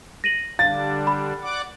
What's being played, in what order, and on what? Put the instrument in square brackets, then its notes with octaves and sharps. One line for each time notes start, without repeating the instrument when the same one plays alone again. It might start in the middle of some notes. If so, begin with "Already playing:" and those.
[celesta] A#6 D#7 F#7
[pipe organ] D3 G3 D4 [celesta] F5 [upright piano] A6
[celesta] B5
[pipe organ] D5 F#5 D6